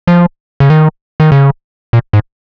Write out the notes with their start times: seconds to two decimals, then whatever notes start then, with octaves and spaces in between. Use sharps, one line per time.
0.07 F3
0.60 C#3
0.70 D#3
1.20 D#3
1.32 C#3
1.93 A#2
2.13 G#2